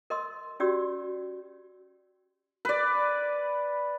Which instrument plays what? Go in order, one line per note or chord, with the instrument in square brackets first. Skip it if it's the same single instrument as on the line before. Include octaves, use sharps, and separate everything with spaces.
[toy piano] A#4 D#5 C6 E6
C#4 F#4 G4 D5 E6
[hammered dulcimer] B4 D5